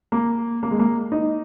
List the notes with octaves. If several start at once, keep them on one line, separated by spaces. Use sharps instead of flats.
A#3
A#3
G#3
A#3
D#4